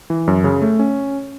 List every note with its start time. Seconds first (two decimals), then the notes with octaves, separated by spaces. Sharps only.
0.10 E3
0.28 F#2
0.44 C#3
0.62 A3
0.79 C#4